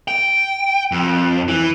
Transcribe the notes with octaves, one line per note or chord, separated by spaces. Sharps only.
G5
F2
E3